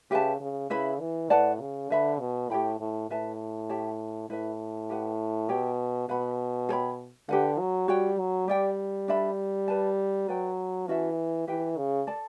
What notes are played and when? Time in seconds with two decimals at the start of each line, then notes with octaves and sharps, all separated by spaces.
0.11 C#3 G4 B4 E5 A5
0.41 C#3
0.70 C#3 E4 B4 E5 B5
1.00 E3
1.30 A2 B4 D5 F#5 A5
1.61 C#3
1.90 D3 B4 E5 B5
2.20 B2
2.49 A2 G4 C#5 G5 B5
2.80 A2
3.10 A2 B4 E5 A5
3.69 G4 C#5 E5 A5
4.30 A2 E4 B4 E5
4.90 G4 B4 F#5
5.49 B2 G4 C#5 G5
6.09 B2 B4 F#5 B5
6.69 A4 C#5 G5 B5
7.29 D3 G4 B4 F#5
7.59 F#3
7.88 G3 F#4 C#5 G5
8.19 F#3
8.48 G3 G4 D5 G5
9.08 D4 A4 E5 B5
9.68 B4 D5 A5
10.28 F#3 B4 D5 G5
10.87 E3 C#4 F#4 A4 E5
11.47 E3 G4 B4 E5 G5
11.77 C#3
12.07 A4 D5 A5